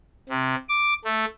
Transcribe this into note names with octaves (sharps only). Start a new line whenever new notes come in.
C3
D6
A3